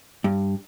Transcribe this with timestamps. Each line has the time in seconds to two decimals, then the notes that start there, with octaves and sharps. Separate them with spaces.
0.24 G2